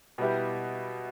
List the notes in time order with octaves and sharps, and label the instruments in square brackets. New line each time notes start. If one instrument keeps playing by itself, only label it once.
[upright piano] B2 G3 B3 E4 G4